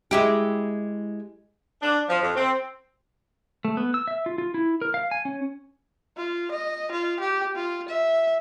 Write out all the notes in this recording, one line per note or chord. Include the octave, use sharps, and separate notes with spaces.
G#3 E4 G4
D4
F3
F2
C4
A3
B3
E6
E5
F4
F4
E4
A#4
F5
G#5
C#4
F4
D#5
F4
G4
F4
E5